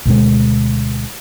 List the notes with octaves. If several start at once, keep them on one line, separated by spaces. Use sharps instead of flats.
D2 B2 G#3